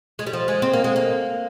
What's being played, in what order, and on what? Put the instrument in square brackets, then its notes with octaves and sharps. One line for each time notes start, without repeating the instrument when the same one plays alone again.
[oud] G#3
G3
F3
G#3
C4
A#3
G#3
A#3